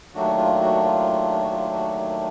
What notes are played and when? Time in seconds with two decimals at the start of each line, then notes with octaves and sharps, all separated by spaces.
0.15 D#2 D#3 F#3 A3 D4 F#4
0.38 F4
0.60 F#4
0.83 F4
1.41 F#4
1.51 F4
1.74 F#4